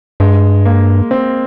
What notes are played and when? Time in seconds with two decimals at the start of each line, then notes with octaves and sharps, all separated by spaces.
0.20 G2 G#3
0.65 A#3
1.11 C4